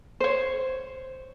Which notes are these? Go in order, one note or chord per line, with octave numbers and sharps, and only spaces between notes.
C5 C#5